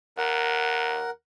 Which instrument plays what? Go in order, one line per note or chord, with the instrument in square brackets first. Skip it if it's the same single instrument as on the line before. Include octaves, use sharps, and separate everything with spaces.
[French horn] D#2 [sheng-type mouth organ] A#4 F#5